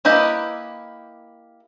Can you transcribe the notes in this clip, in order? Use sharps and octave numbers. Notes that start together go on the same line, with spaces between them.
A#3 E4 G4 B4 D#5